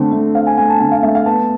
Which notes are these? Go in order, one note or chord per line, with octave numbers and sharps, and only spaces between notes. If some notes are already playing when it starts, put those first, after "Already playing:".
Already playing: D3 A3 C4
A3
C4 F5
G#5
A3 G#5
A5
D3 G#5
F5
A3 E5
F5
B3 A5